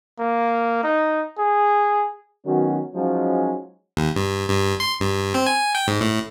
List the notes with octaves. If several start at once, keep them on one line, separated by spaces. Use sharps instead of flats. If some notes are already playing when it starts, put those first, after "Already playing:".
A#3
D#4
G#4
D#3 F#3 B3 C#4 F#4
F3 F#3 G#3 C#4 D#4
D#2
G2
G2
C6
G2
C4
G#5
G5
G#2
A2